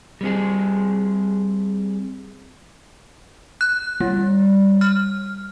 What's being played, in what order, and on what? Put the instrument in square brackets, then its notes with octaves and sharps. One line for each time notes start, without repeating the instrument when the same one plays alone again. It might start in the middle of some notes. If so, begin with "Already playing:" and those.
[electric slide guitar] G3 C4 G#4
[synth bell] F#6
G3
F6